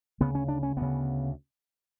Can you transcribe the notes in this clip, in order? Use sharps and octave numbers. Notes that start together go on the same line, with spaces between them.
D2 C#3 B3
C#4
D4
C#4
D2 C#3 B3